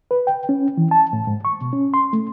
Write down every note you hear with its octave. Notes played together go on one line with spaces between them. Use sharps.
B4
G5
C#4
E3
A5
A2
G#2
C#6
B2
C#4
C6
A3